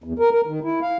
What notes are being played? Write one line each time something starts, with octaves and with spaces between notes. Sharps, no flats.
E2
A#4
A#4
D#3
E4
F5